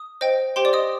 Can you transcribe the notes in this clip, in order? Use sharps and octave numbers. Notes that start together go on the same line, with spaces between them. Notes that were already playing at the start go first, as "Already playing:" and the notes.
Already playing: D#6
C5 D#5 G5
G4 C5 G5 C6
D5 D6
D#5 D#6